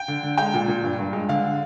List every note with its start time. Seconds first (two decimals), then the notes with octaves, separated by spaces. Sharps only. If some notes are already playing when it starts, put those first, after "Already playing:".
Already playing: G5
0.08 D3
0.23 D3
0.38 G#3 G5
0.54 A#2
0.68 A#2
0.84 G2
0.99 G2
1.13 G#3
1.29 D3 F5